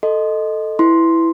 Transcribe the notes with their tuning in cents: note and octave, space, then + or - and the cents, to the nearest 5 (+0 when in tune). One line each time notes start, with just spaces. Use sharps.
A4 +0 D#5 +0 C6 +0
E4 +0 B4 +10 C6 +0